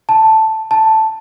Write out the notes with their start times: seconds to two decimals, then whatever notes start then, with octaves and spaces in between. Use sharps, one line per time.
0.09 A5
0.71 A5